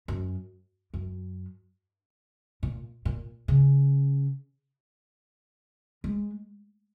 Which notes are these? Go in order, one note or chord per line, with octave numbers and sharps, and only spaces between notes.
F#2
F#2
A#2
A#2
C#3
G#3